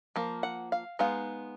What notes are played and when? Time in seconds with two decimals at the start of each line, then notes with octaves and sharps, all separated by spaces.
0.16 F3 A#3
0.43 F#5
0.72 F5
0.99 G#3 B3 D#4 F5